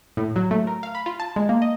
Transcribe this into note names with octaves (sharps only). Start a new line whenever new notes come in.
A2
F#3
A3
A#4
F5
B5
F4
A5
G#3
A#3
D#5